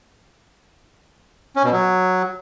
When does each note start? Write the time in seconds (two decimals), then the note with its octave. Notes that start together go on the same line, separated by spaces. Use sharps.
1.56 C#4
1.64 B2
1.72 F#3